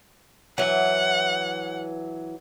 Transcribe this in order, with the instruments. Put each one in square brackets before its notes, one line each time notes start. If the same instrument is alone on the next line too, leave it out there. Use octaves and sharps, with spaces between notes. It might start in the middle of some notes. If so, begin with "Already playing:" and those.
[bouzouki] E3 F#3 [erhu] F#5